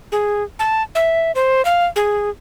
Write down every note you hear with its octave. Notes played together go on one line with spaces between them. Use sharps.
G#4
A5
E5
C5
F5
G#4